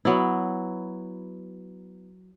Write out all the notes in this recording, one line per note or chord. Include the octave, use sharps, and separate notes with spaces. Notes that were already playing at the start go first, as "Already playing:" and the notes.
F#3 B3 E4